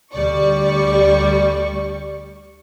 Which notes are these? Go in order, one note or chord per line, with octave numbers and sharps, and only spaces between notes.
D2 G3 D5 C#6